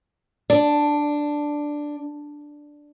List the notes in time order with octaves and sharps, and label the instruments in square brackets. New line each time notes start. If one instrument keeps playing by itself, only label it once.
[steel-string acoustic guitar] D4 [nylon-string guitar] D5